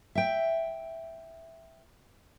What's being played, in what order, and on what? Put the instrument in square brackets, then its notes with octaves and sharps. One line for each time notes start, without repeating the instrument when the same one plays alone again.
[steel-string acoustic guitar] E5 G5